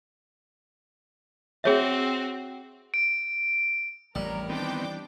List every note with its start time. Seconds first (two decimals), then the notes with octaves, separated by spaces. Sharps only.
1.64 C4 F#4 G#4 C#5 E5
2.94 D7
4.15 A1 F2 G3 A#4
4.49 D#3 E3 B3 C4 D4 G5 D6